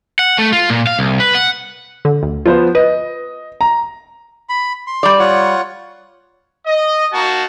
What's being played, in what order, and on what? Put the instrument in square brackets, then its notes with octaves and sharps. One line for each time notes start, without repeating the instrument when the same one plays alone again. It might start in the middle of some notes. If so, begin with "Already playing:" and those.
[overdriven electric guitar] F#5
A3
F4
A#2
F5
C2
B4
F#5
[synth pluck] D3
D2
[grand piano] F3 B3 C5 [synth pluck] F4 B4
[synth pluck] B4 [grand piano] D#5
[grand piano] A#5
[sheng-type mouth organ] B5
C6
[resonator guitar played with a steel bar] G3 D5
[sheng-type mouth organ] F4 C#5 F#5
[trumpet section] D#5
A#3 D#4 F#4 A5